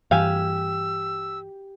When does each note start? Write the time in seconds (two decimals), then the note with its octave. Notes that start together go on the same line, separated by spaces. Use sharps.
0.11 G2 E3 G4 F5 G#5 E6